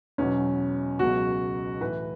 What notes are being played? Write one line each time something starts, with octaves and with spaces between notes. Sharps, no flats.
E2 B2 F#3 C#4
C#2 B2 F#3 F#4
A2 E3 B4